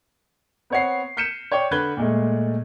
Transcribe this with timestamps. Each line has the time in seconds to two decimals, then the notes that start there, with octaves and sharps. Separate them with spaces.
0.70 B3 C4 C#5 F#5 C7
1.17 F6 G6 B6 C#7 D#7 E7
1.52 C#5 D5 G5 C#6
1.71 D3 B4 F#6 G#6 G7
1.97 A#2 G#3 A3